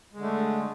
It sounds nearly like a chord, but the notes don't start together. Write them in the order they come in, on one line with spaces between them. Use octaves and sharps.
G#3 D3 A3